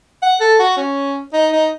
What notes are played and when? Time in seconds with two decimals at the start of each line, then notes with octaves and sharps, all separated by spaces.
0.22 F#5
0.40 A4
0.59 F#4
0.77 C#4
1.33 D#4
1.52 D#4